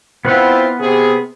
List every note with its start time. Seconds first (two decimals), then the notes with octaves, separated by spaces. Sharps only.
0.25 B3 C4 E4 F4 B4 F#5
0.79 C3 G#4